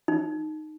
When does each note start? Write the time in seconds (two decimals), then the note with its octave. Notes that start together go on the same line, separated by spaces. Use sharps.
0.08 D#4